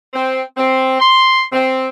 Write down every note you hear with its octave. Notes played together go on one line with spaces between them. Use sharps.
C4
C4
C6
C4